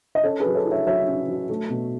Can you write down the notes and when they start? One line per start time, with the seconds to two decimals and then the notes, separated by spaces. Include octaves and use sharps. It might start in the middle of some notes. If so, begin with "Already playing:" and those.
0.15 D#5
0.24 C#4 A4 C#5
0.40 G#4 B4
0.46 F#3
0.55 A4 C#5
0.65 E4
0.71 C#5 E5
0.86 F#3 C#5 E5
1.07 C#4
1.28 F#3
1.50 A3
1.70 B2